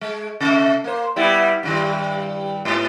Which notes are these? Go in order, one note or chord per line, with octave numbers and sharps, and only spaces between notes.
G#3
C3 A3
A#3 C5
G3 B3 E4
G2 D#3 G3
G#2 B2